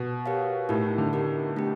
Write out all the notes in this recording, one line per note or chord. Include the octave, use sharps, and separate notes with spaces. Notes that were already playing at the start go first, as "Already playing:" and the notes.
Already playing: B2
G4 A#4 C#5 F5
A2 D#4 G4 A#4
D3
D#4 G4 A#4
A3 D4 G4